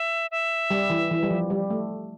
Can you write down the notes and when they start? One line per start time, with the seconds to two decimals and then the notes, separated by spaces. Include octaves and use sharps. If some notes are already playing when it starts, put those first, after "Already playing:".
Already playing: E5
0.31 E5
0.71 G3
0.90 E3
1.11 E3
1.23 G3
1.30 F3
1.50 G3
1.70 A3